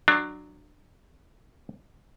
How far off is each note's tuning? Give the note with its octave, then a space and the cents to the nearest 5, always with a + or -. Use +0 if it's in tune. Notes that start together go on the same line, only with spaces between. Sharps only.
F#3 +0 D4 +20 A#4 +0